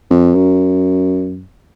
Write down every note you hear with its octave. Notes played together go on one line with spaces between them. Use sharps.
F2
F#2